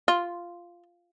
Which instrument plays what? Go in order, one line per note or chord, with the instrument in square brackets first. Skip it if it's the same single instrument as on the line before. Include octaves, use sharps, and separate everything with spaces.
[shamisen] F4